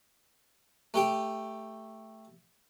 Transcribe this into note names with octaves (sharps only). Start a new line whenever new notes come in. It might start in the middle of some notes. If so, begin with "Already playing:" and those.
A3 G4 G5